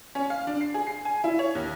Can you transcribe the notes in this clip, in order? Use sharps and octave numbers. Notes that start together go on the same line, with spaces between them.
C#4
F5
D4
C7
G#4
C7
G#5
E4
C#5
D#2